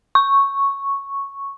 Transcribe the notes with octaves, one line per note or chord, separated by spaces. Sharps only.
C#6